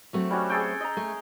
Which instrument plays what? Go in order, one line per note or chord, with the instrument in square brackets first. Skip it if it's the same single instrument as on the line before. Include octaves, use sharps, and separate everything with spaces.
[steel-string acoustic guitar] F#3 A3 C4
[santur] G3 C#4 F#4
G#4 A4 G5
D#5 A#5
[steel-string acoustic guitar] A3